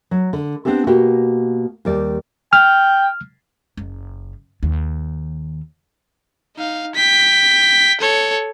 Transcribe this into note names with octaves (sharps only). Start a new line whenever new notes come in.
F#3
D3
B3 C4 D4 G4 A4
B2 A#3 F#4 G4
D#2 G3 D5
G5 F6
F#1
D#2
D#4 F5
G5 B6
A4 C#5